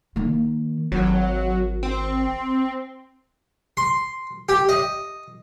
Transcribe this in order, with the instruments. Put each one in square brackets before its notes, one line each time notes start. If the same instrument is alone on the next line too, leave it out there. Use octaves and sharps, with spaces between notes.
[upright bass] D#3 A#3
[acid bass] G#1 [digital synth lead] F#3
[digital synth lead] C4
[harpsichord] C6
G4
D#5